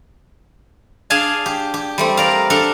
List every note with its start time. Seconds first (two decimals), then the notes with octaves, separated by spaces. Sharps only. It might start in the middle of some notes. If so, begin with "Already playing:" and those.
1.10 D4 G#4 F5 G#5 A5
1.46 G4
1.74 G4
1.98 G3 A3 C4
2.17 A#4 D5 F5
2.50 D4 A4 F5